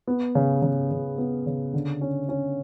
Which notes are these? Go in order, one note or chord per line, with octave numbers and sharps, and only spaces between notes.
B3
C#3
C#3
C#3
B3
C#3
D3
C#4
C#4